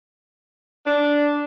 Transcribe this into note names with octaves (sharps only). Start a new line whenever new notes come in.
D4